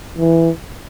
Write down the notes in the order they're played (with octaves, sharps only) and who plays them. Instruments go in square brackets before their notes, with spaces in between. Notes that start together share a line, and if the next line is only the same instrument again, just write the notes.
[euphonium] E3